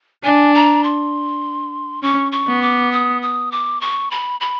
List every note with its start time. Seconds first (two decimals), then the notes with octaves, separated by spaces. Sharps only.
0.24 D4 G#5
0.54 A#5
0.84 C6
2.02 C#4 C#6
2.32 C#6
2.48 B3
2.62 D6
2.92 D#6
3.22 D#6
3.52 D6
3.81 C#6
4.11 B5
4.41 B5